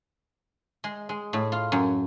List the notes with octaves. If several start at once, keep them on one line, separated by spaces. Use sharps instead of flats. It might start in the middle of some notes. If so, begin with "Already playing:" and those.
G#3
G#3
A2
F4
F#2